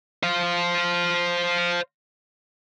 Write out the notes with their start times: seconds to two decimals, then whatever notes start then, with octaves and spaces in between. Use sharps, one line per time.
0.23 C5 F5